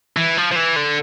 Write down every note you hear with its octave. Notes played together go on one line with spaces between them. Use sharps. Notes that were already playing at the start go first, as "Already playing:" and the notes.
E3
F3
F3
E3
D3